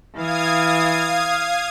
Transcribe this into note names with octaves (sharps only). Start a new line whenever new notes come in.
E3 F5 D#6 G#6